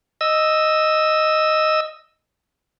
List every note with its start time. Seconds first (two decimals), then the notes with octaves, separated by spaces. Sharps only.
0.21 D#5 E6